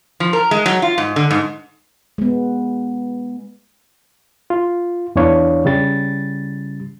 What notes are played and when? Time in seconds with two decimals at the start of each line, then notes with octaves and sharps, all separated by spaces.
0.20 F3
0.33 A#4
0.51 G#3
0.66 F#3
0.82 F4
0.98 G#2
1.16 D3
1.31 G#2
2.18 G#3 B3
4.50 F4
5.16 E2 E3 D4 C#5 F5
5.65 C#3 G3 A6